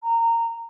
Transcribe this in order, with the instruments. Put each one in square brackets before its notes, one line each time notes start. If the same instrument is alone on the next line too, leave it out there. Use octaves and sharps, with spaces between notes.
[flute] A#5